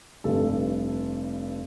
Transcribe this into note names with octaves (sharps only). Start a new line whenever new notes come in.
F1 G2 A4